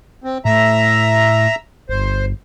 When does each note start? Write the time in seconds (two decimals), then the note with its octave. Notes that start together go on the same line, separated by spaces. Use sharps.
0.24 C4
0.45 A2 E5 A#5
1.89 G1 C5